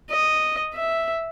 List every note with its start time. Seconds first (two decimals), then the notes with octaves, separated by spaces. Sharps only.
0.10 D#5
0.74 E5